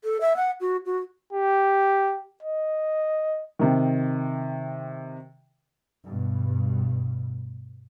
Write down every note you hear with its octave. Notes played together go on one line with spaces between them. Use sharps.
A4
E5
F#5
F#4
F#4
G4
D#5
C3 D#3
G2 B2